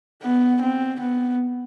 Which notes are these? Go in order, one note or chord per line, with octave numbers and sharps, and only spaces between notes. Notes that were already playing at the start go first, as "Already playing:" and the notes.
B3
C4
B3